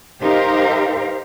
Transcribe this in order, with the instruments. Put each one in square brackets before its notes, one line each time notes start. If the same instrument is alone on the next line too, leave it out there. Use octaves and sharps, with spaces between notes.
[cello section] D#4 G4 A#4 C5 F5